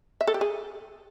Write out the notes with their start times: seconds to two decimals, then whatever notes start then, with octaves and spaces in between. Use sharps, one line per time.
0.21 E5
0.27 A4
0.34 G4
0.41 G#4